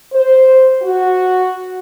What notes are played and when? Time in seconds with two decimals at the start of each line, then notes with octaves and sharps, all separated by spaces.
0.13 C5
0.82 F#4